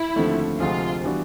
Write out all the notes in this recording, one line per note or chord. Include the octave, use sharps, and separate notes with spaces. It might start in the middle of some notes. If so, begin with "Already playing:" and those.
Already playing: E4
D#2 D3 F3 A3 C4
D2 C3 F3 G#3 F4
E3 G3 B3 D4 F#4